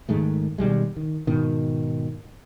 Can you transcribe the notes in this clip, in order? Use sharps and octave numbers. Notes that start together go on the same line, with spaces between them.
G#2 D#3 G#3 A3
B2 D#3 G3 G#3
D#3
G#2 B2 D#3